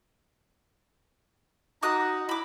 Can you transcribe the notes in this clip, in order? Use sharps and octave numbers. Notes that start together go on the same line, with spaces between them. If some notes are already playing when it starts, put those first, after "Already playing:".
D#4 F#4 A#5 D6 D#6 F#6
E4 B5 D6